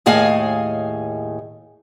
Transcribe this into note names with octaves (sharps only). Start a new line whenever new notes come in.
D#2 A2 G#4 D#5 F5 G#5